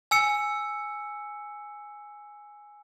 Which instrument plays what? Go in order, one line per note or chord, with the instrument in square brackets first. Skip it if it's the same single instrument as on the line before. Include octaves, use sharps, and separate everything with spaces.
[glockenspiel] G#5 E6 C#7